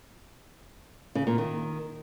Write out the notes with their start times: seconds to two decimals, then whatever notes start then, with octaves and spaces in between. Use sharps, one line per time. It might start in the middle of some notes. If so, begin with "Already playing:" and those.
1.15 C#3
1.27 A#2
1.38 D#3